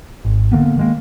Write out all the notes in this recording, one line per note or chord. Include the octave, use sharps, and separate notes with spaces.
G#1
D3 D#3 A#3 B3
D#3 G#3 A#3